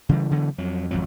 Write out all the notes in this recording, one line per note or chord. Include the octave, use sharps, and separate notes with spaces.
C#3 E3 G3
C#3 E3 F#3 B3
F2 F#3
G#1 F2 F#3